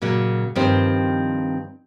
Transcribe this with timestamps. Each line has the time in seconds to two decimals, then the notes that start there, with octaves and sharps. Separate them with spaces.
0.02 A#2 C#3 F#3
0.55 G2 D#3 F3 C4 G4 C5